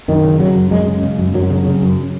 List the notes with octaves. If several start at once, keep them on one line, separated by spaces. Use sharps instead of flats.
F#2 D#3
C#3
C#3 F#3
F#2
F#2 G#3
C#3
C#3
F#2
F#2 F#3
C#3
C#3
F#2